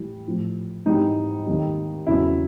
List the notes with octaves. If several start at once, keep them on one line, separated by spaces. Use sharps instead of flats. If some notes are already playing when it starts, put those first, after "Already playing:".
Already playing: A2 E3 G3
A2 F3
G#2 E3 G3 D#4
D#2 D#3 G3
E2 C#3 F#3 E4